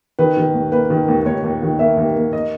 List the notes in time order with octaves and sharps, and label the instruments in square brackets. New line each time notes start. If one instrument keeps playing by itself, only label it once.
[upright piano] D#3 B4
D#3
D#2
A#3 B4
D#3
D#2
D#2 C#5
D#2
D#3
A#3 E5
D#2
A#3
D#5